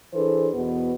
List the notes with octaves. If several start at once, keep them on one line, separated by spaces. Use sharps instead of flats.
E3 D4 G#4 A4 C5
E2 B2 B3